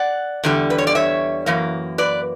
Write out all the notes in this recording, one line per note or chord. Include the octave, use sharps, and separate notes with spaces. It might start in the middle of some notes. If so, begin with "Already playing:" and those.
Already playing: D5 F#5
E2 D3 G3
B4
C#5
D5
C#5 E5
F#2 E3 A#3
B4 D5